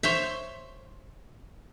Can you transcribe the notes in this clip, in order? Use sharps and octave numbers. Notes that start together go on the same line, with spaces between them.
C5 C#5 E5